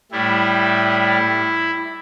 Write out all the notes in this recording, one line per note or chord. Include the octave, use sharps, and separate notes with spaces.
A2 G3 E4